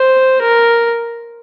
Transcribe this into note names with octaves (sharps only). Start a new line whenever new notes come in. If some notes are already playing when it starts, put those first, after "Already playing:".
Already playing: C5
A#4